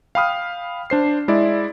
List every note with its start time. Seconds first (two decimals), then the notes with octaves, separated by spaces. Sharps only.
0.15 F5 G5 B5 D#6 F6
0.90 D4 C5 C7
1.28 G#3 E4 D5 E5